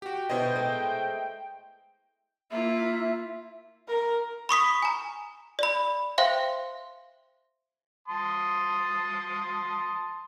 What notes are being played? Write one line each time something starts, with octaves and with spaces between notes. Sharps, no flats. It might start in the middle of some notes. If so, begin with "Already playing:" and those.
F#4 G4 G5
B2 D3 D4 E4 C5 D#5
G#3 A3
A#3 E4 F4 E5
A#4
B5 C#6 D#6 B6
G#5 A#5
D5 B5
C5 E5 F5 G5 C6
A5 C6 D#6